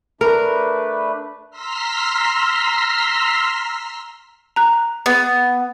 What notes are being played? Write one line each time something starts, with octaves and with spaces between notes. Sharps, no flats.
A3 D4 A#4 B4
A#5 C6 E6 F6 B6
A#5 F#6
B3